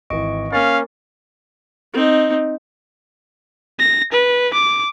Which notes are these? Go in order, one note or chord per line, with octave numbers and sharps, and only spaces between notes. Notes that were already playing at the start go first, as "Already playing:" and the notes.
G#1 E3 D#5 C#6 D7
A#3 C#4 A#4 F5 A6
C4 D#4
A#6
B4
D6